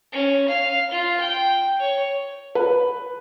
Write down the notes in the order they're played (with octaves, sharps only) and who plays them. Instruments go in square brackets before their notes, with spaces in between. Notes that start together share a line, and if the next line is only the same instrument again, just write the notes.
[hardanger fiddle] C#4
F5
F4
G5
C#5
[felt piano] B4